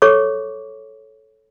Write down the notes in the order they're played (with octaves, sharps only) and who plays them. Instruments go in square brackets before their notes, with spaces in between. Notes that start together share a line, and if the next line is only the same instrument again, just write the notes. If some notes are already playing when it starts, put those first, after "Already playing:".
[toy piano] A4 C#5 C#6 D6